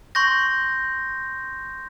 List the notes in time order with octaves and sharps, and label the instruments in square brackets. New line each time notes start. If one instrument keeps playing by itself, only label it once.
[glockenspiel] C6 C#6 G6 A#6